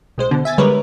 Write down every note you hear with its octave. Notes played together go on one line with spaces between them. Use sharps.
B1 G#3 C5
B2 D3
E5 G#5 A6
D3 G3 G#3 A#4 B4 C#5